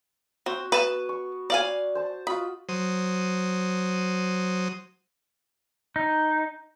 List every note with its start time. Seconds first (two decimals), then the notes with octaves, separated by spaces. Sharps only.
0.46 C4 F#4
0.72 B3 B4 A5
1.09 C#6
1.50 D5 F5 G#5
1.95 C5 A5
2.27 F4 F#4 D#5 B5
2.69 F#3 C5 D#6
5.96 D#4